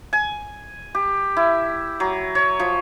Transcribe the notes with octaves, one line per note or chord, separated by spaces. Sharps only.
G#5
G4
E4
F#3
C#5
F3